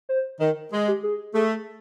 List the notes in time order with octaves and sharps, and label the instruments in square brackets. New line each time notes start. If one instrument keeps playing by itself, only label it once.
[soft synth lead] C5
[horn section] D#3 [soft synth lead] A#4
[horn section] G#3 [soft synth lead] G#4
[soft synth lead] G4
G#4
[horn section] A3 [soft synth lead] G#4